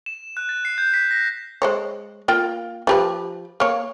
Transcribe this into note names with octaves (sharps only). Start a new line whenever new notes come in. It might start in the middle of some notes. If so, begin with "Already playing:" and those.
E7
F#6
A6
C7
G6
B6
A#6
G#3 C5 C#5
A#3 F4 G5
F3 G4 B4
A#3 C#5